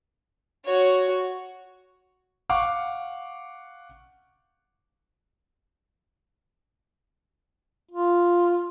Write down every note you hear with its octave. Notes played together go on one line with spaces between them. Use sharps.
F#4 C#5
F5 F#5 C#6 D6
F4